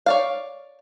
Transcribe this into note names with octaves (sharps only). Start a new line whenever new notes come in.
C#5 D5 F5